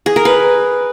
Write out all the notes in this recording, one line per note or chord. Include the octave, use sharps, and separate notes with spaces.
G#4
A#4
B4